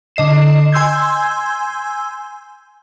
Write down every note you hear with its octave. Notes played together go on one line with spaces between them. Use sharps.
D3 D#5 C7 E7
G#5 C6 E6 G6 G#6